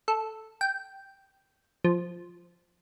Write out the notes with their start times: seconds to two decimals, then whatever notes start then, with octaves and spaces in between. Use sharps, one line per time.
0.08 A4
0.61 G5
1.85 F3